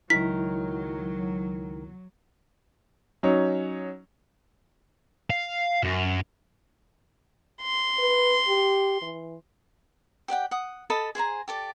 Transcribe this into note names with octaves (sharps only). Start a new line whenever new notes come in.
C#2 D#3 F#3 E4 A#4 B6
F#3 C#4 D#4 C#5
F5
F#2
C6
B4
G4
E3
G4 D5 F#5 G5
F#5 D#6
A4 D#5 A5 B5
G#4 C5 G#5 A#5
G4 A4 D5